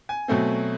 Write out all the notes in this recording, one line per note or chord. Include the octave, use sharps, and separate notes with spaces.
G#5
B2 F#3 A3 C4